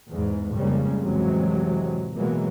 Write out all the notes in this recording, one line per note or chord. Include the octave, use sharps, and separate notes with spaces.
E2 G#2
F2 C#3 G3 G#3 A#3
F2 A2 C3 E3 F#3 G#3
B2 E3 F#3 G#3 A#3